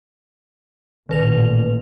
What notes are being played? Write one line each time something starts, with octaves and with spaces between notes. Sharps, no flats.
A1 A#2 D#3 B4 F7